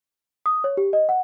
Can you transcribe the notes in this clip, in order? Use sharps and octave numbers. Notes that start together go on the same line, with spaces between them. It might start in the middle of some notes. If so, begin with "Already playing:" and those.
D#6
C#5
G4
D#5
F#5